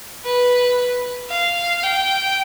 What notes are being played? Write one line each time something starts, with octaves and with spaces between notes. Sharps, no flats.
B4
F5
G5